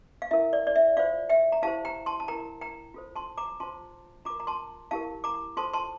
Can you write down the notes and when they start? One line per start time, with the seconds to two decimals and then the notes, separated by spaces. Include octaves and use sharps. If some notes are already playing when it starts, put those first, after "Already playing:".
0.22 F5
0.31 E4 A#4 E5
0.53 D5
0.67 D5
0.76 E5
0.97 F4 C5 D5 F5
1.29 E5 G5
1.52 A#5
1.62 E4 G4 C5 F5 A5
1.85 G5 A#5
2.06 A5 C6
2.20 A5
2.28 E4 A#4 G5 A#5
2.61 G5 A#5
2.94 F4 A4 C5
3.16 A5 C6
3.37 A#5 D6
3.60 F4 C5 A5 C6
4.25 F4 A#4 A#5 D6
4.40 A#5
4.47 A5 C6
4.91 E4 G4 A#4 F5 A5
5.24 A#5 D6
5.57 F4 A4 C5 A5 C6
5.73 A5 C6